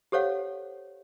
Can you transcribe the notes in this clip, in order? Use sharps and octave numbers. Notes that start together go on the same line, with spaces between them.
G4 A4 C5 C#5 F5 F#5